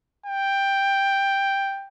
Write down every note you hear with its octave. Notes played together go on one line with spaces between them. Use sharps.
G5